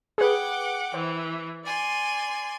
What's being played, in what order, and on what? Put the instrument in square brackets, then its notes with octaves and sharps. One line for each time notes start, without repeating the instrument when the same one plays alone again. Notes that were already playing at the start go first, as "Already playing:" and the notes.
[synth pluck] G#4 B4 [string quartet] F#5 G5 D6
[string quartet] E3 [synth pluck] C5
[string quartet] D5 G#5 C6